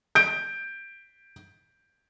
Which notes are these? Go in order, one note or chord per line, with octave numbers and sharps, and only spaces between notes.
G6 D7